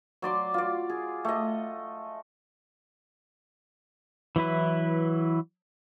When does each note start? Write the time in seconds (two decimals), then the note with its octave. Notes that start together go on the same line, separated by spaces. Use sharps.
0.22 F#3 D5 C6 D6
0.54 F4 D5
0.89 G#4
1.25 A3 D#5
4.36 E3 F#3 E4 B4